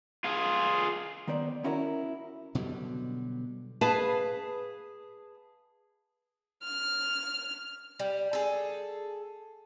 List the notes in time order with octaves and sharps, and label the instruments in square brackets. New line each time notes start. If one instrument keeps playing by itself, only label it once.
[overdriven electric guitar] F4 G#4
[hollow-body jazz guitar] D#3 B3 C5 D5
C#4 E4 F#4 A#4
[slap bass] B2 D3 F#3 G3
[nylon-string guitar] G#4 B4 F5 A5
[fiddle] F6
[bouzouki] G3
G#4 A4